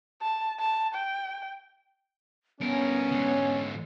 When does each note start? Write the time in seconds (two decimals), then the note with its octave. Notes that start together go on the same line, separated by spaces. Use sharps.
0.22 A5
0.59 A5
0.95 G5
2.61 G2 B3 C#4 A#4
3.12 G#2 D3